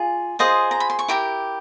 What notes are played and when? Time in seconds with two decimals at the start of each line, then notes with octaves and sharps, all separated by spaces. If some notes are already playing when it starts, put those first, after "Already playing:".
Already playing: F4 G#4
0.39 F4 G#4 C5 D#5
0.71 A#5
0.80 B5
0.90 C6
0.99 C#6
1.08 E4 G4 A#4 D6